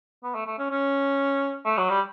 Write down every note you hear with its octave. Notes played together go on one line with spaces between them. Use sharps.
B3
A3
A3
C#4
C#4
A3
F#3
G3